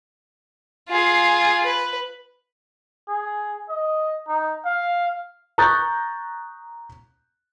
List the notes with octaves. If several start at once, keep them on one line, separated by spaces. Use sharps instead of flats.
F4 G#4
B4
G#4
D#5
D#4
F5
A#5 C#6 D#6 F#6 G6 A6